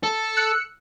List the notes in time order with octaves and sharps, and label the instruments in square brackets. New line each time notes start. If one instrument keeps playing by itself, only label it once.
[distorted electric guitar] A4
[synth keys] E6 F#6 C#7